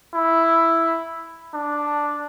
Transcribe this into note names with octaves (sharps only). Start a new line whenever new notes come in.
E4
D4